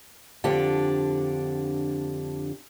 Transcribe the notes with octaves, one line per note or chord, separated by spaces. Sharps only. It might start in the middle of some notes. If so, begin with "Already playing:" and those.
F2 D3 D4 G4